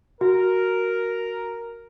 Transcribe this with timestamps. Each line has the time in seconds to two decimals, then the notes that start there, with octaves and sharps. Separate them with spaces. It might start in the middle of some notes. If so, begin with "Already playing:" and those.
0.21 F#4 A#4